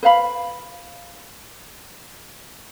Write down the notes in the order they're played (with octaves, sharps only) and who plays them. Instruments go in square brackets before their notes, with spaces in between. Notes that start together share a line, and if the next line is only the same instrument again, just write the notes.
[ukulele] B4 C5 F5 B5